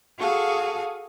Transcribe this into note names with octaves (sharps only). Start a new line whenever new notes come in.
F#4 G#4 A4 F5